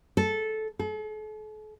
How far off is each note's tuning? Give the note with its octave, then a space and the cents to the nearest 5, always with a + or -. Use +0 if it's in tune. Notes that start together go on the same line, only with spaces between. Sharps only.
A4 -10
A4 -45